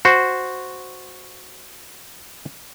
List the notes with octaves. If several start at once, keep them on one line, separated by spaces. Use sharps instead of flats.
F#4 C5